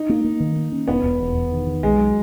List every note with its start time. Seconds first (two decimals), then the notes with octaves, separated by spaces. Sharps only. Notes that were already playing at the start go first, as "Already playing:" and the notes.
Already playing: D#4
0.09 A#3
0.24 A#3
0.40 D#3
0.56 A#3
0.72 C#4
0.88 E1 B3
1.04 E1
1.20 E2
1.35 E2
1.51 D#3
1.67 D#3
1.83 B1 G#3
1.98 F#3